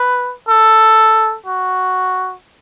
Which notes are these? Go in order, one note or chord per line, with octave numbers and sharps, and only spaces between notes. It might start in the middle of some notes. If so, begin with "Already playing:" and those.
Already playing: B4
A4
F#4